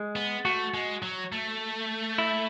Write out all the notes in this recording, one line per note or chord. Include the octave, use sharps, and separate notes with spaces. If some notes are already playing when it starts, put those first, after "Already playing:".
Already playing: G#3
B3
A3 F#4
G#3
F#3
A3
E4